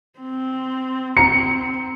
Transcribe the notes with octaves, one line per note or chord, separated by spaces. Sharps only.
C4
C4 A#5 C#7